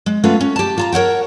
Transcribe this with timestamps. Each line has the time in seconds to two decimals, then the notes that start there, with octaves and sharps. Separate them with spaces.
0.06 G#3
0.24 A3 B3 C#4 F4 B4
0.41 C#4
0.56 G4 A5
0.78 F4 A5 A#5
0.92 A#4 C#5 F#5 G5